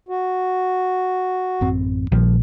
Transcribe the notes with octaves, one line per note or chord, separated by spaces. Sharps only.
F#4
A1 F#2 C4
A#1 D#3 F3 G3